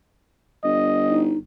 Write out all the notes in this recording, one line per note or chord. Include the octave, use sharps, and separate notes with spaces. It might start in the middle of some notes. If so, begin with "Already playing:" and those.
G1 D#5
D#4